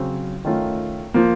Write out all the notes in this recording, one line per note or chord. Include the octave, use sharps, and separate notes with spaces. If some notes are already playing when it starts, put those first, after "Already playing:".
Already playing: C#3 F#3 C4
D#3 A3 C#4 F4
F3 A#3